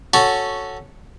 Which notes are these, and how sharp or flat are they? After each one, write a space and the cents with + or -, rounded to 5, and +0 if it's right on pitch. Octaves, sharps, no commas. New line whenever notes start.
C#4 +0 F#4 +0 A4 +0